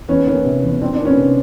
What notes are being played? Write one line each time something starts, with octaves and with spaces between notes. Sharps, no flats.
E2 B3 C#4
D#3 B3 C#4
C3
E2
E2 C4 D4
C4 D4
D#3
B3 C#4
C3